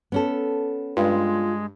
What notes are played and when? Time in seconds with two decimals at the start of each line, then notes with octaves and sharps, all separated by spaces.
0.12 B3 C#4 A4
0.97 G2 G#3 F4